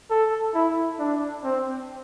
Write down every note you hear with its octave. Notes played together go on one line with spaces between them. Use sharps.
A4
E4
D4
C4